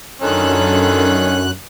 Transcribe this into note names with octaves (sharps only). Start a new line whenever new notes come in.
F#2 D3 D#3 C#4 D#4 F4 A4 F#6